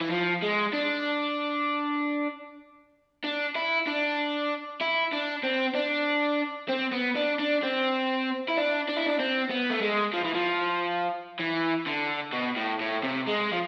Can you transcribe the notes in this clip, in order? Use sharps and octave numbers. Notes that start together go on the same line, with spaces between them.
E3
F3
G#3
D4
D4
E4
D4
E4
D4
C4
D4
C4
B3
D4
D4
C4
E4
D4
D4
E4
D4
C4
B3
A3
G#3
F3
E3
F3
E3
D3
B2
A2
A2
C3
G#3
F3